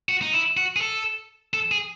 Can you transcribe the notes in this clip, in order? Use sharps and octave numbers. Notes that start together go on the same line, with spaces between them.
F#4
D#4
E4
F#4
G#4
A4
A4
G#4